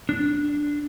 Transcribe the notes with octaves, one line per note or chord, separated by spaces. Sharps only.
D4